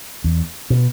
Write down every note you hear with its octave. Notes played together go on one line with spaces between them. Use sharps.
E2
B2